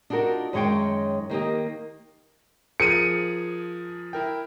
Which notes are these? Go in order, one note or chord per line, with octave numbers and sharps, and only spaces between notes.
D4 D#4 F4 F#4 A#4
F#2 D#3 G#3 C#5 F5 G5
D#3 A#3 G4 D#5
F3 G#4 A#4 C#7 D#7
E4 A#4 G5